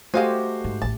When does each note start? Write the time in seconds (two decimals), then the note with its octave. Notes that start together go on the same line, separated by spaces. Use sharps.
0.14 G#3 A3 F#4 G4 C5 F5 G#5
0.64 G#2
0.82 A1 E2 A5